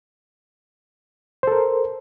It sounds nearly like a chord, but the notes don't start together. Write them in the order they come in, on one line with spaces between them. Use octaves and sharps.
C5 A4 A#4